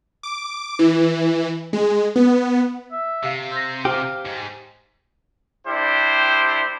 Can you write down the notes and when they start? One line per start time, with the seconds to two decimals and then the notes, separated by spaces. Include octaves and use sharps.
0.23 D6
0.79 E3
1.73 G#3
2.16 B3
2.92 E5
3.23 C3 G4 F5
3.52 C5 E6 A#6
3.85 G4 C5 F5 D6
4.25 G#2
5.68 G3 D4 E4 G4 C5